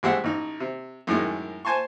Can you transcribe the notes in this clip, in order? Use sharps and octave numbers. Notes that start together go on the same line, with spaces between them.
A1 G3 G#3 C5 E5 F#5
A1 D#4
C3
F#2 A2 D#3 G#3
C5 G#5 A5 C6 C#6